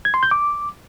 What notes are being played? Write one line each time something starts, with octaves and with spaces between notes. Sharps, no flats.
G#6
C6
G6
D6